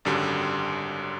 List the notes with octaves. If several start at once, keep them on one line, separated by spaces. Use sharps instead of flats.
G#1 F#2 D3 G3